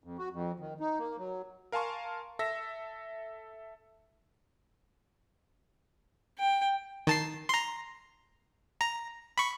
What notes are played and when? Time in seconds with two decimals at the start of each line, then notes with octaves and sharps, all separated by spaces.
0.04 F2
0.18 F#4
0.33 F2
0.60 D#3
0.80 D#4
0.99 A#3
1.19 F#3
1.72 A#4 F5 G#5 A5 C6 C#6
2.39 A4 E5 E6 A#6
6.39 G5
7.07 D#3 A5 C7
7.49 A#5 C6
8.81 A#5
9.38 B5 C#6